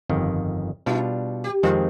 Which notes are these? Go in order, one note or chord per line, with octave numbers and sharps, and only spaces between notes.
G1 F2 D#3
B2 G3 D4 D#4 F4
G4
F2 D#3 G#3 C4 F4